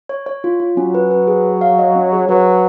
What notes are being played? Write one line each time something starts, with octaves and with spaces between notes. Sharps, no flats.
C#5
C#5
F4
F4
F#3 C#4
B4
B4
G#4
G#4
F5
D#5
C#4
G#4
F#3 B4
B4